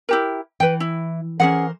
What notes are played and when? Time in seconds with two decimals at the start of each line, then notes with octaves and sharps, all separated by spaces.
0.09 E4 G4 A#4
0.60 E3 B4 G5
0.80 E4
1.40 E3 C#4 G#4 A#4 C5 F#5